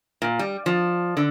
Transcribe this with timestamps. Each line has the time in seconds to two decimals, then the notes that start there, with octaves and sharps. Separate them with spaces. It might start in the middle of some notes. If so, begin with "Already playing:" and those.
0.22 A#2
0.39 G3
0.66 F3
1.17 D3